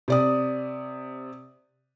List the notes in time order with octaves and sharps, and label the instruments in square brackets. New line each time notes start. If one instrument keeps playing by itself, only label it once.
[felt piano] C3 D5 D#6